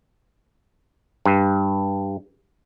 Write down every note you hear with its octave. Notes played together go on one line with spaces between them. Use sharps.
G2